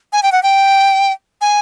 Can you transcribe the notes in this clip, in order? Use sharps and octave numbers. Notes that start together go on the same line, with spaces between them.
G#5
G5
F#5
G5
G#5